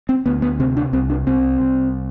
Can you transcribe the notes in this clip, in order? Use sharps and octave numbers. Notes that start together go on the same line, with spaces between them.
C4
D2 B3
B3
C3 C4
D4
C2 C4
D4
C2 C4
C2